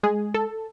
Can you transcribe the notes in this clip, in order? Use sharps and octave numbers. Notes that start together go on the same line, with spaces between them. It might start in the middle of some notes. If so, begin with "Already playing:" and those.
G#3 G#4
A4